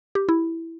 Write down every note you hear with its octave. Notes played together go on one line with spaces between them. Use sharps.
G4
E4